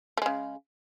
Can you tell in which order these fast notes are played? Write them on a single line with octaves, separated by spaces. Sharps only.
A3 G#3 C#3